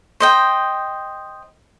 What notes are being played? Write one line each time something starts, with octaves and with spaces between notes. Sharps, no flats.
C5 D#5 G5